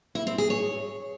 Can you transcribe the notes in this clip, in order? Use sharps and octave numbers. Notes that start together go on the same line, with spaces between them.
E4
C4
G#4
C#5